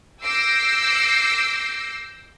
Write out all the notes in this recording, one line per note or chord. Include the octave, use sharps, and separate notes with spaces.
D6 E6 G6 A#6 C7 D7